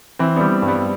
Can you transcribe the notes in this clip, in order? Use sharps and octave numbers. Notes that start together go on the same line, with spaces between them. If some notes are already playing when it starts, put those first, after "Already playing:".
E3 C4 E4
G3 B3 D4
G2
G3 B3